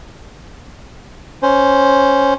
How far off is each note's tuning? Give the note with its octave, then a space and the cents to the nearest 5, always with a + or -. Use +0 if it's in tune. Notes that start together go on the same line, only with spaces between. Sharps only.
C#4 +0 C5 +0